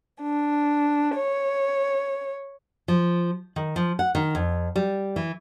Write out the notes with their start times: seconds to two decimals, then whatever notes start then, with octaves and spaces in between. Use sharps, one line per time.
0.22 D4
1.14 C#5
2.88 F3
3.56 D#3
3.76 F3
3.99 F#5
4.15 D#3
4.35 F2
4.76 G3
5.16 E3